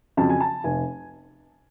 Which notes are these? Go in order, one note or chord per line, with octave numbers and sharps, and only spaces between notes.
F2 C#3 F#3 A5
G#5
A5
F1 G#5